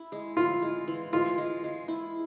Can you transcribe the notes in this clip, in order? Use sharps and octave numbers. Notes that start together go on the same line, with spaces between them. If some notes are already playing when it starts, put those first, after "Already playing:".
Already playing: E4
G#3
E4 F4
G#3
E3
G#3 F4
G#3
G#3
E4